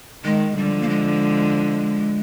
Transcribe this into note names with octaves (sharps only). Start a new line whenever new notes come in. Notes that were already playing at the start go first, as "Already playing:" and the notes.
D#3 G#3
D3 F3 G3
A#3
G#3